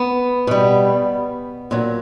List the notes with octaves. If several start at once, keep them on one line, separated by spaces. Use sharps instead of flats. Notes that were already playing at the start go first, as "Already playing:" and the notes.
Already playing: B3
B2 G3
A#2 F#3